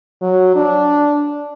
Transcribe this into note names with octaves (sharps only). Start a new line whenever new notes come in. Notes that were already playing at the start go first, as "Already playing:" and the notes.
F#3
D4